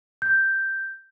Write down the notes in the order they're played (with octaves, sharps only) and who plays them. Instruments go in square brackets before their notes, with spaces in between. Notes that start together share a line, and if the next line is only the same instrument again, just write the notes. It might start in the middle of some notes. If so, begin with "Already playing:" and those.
[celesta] G6